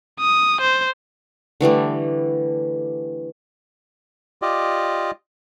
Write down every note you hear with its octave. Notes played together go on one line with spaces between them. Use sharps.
D#6
C5
D3 E3 G3 A3
F4 G4 D5 D#5